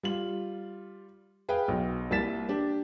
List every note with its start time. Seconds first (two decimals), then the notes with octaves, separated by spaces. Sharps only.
0.03 G3 F4 F#7
1.49 G#4 B4 F5 G5
1.68 B1
2.11 C2 A#3 E4 A6 B6 E7
2.49 D4 G4